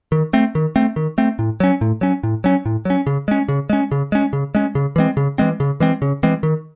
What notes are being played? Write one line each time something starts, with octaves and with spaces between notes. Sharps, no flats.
D#3
A3 C4
D#3
A3 C4
D#3
A3 C4
A2
F#3 C#4
A2
F#3 C#4
A2
F#3 C#4
A2
F#3 C#4
C#3
G#3 C#4
C#3
G#3 C#4
C#3
G#3 C#4
C#3
G#3 C#4
C#3
E3 G#3 C4
C#3
E3 G#3 C4
C#3
E3 G#3 C4
C#3
E3 G#3 C4
D#3